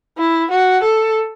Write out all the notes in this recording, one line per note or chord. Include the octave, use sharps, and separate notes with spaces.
E4
F#4
A4